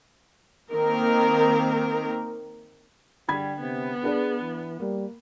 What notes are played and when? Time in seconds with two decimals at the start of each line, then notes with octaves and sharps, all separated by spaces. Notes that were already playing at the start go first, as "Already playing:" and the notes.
0.72 D#3 A#3 C4 A#4
3.28 D3 G3 B5 G#6
3.60 C3 B3
4.03 D4 G#4 B4 D5
4.41 E3
4.80 G3 A#3